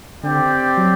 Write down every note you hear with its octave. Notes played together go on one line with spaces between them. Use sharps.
D3 C4 G4 D5 G5
F#3